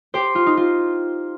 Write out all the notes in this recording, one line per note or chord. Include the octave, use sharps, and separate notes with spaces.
G4 C5
F4
D#4
F4